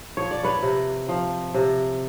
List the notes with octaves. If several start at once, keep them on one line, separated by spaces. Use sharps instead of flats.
F3 C#5
D5
B4 C#5
C3
F3
C3